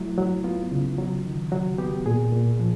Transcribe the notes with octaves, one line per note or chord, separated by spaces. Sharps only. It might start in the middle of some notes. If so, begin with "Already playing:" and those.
Already playing: F#3 A3 E4
F#3
B3 F4
C#3
F#3
D#3
F#3 F#4
B3 G4
A#2 G#4
A#2
F3